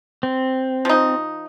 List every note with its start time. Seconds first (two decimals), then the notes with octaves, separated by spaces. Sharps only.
0.23 C4
0.85 F3 D#4